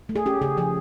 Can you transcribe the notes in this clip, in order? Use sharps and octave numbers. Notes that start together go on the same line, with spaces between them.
A3
G#4
C#4 G4
C#3 G#4
F3 G#4